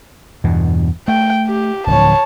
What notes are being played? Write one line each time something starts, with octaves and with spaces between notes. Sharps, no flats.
E2 G2 B2
A3 G5
G4
D1 D3 F3 C#5 A5